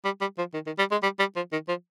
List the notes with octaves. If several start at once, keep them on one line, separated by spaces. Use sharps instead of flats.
G3
G3
F3
D#3
D#3
G3
G#3
G3
G3
F3
D#3
F3